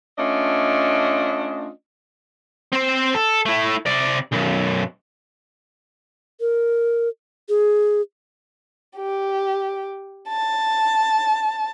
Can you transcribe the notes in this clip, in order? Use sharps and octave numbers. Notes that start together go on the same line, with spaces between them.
A3 C#4 D4 F4 D#5
C4 C5
A4
A3 E4
C3 D5
B1 F#2
A#4
G#4
G4
A5